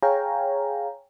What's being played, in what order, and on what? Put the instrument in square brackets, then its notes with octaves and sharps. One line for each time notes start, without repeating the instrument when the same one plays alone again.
[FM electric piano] G#4 C#5 F5 G5 G#5 A#5